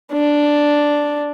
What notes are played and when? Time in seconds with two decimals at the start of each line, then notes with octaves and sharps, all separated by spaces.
0.13 D4